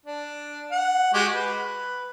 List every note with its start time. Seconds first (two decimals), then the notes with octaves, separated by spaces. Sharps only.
0.06 D4
0.72 F#5
1.14 G#3 F#4 G4
1.33 B4